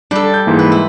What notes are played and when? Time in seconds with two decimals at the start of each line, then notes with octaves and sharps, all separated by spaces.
0.11 G3 D4 A4
0.34 G6
0.46 G#2 E3 A#3
0.59 B4
0.72 E4